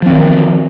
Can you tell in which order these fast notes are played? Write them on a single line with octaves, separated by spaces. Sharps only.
F3 C4 D#3